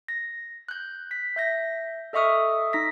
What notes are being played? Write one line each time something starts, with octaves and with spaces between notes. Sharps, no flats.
A#6
F#6 G6
B6
E5 G6 A#6
A4 D#5 E5 C#6 D#6 F6
D#4 A#6 B6